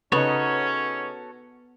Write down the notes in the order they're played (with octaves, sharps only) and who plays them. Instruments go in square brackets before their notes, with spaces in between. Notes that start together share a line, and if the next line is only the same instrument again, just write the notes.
[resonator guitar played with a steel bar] C#3 D#4 [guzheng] B3 [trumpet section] C#4 [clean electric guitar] F#4 A4 C#5